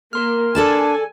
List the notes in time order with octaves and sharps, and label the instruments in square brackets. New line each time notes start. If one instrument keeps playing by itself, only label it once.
[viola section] A#3 [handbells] A#4 C6 F6
[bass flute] D4 [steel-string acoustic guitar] A4 D5 A5 [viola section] G#5